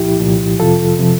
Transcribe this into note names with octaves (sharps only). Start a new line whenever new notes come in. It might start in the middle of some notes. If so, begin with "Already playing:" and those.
Already playing: C2 A#2 F3 E4 G4
C2 A#2 F3
F2 C3 F3 F4 A4
C3 F3